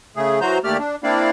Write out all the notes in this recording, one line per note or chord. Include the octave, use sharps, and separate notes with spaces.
C#3 A3 G#4
E3 F#3 F#4 C5 A#5 G6
D#2 A3 A#3 G4 D5 F6
D4
A#3 C4 D4 E4 D5 F5